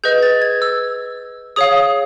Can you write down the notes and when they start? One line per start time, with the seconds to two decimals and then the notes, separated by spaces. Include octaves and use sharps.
0.04 G#4 B4 D#5 G6
0.23 A6
0.42 G#6
0.62 E6
1.56 G#4 C#5 F5 D#6